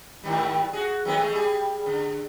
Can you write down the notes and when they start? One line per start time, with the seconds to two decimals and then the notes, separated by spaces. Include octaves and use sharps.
0.24 G#2 D#3 G3
0.73 F#4 G#4
1.05 D#3 F#3 B3
1.17 G#3 A3 G#4
1.33 G3 G#4
1.86 D3